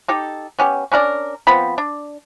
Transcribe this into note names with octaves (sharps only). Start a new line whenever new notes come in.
D#4 G4 A4
B3 C#4 G4
C#4 D4 A#4 D5
F3 B3 C4 B5
D4